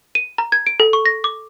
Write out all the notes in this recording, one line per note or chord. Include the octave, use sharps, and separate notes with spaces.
D#7
A#5
G#6
D7
A4
C#6
A#6
D6